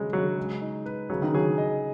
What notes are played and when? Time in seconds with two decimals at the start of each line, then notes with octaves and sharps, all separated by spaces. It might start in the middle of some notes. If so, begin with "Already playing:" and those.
Already playing: C#3 F#3 G#3 C#4 G#4
0.13 C#3 F#3
0.37 G#3
0.61 D#4
0.86 B4
1.10 C#3 F#3
1.22 D#3
1.34 F#3 G#4
1.58 D#5